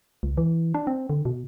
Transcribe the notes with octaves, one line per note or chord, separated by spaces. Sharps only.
C#2
E3
D4
C4
D3
B2